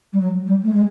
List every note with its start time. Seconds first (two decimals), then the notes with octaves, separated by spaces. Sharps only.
0.13 G3
0.20 F#3
0.46 G3
0.63 A3
0.73 G#3